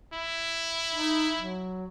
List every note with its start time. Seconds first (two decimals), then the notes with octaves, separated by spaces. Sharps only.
0.13 E4
0.95 D#4
1.37 F#3